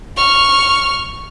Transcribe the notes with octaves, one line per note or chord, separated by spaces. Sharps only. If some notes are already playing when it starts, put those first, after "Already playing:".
C#6 F6